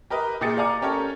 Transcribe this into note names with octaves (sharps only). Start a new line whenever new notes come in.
G4 A#4 B4 D#5
A#2 G4 G#4 D#5 A6 C#7
D5 F5 G#5 A#5 D6
C#4 G4 A4 A#4 C#5